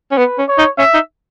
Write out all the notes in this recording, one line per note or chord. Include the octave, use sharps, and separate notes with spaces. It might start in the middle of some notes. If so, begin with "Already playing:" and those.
C#4
B3 B4
C#4
C#5
D#4
C#4 E5
D#4